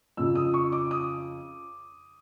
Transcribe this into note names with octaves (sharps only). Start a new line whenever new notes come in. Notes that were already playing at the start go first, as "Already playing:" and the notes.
F2 C#3 F3 E6
D#6
C#6
D6
D#6